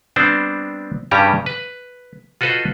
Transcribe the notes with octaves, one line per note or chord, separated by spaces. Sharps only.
G3 B3 C4 D4 C5
G2 C#3 G3 C#4 G4 A#5
B4
F4 F#4 A4 B4 C5 D#5